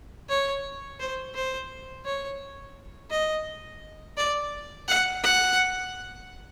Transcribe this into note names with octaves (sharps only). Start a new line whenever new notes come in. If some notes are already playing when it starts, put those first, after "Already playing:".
C#5
C5
C5
C#5
D#5
D5
F#5
F#5